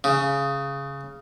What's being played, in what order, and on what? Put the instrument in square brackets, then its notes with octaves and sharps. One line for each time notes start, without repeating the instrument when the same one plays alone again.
[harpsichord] C#3